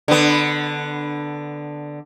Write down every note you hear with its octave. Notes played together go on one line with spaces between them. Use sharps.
D3 B3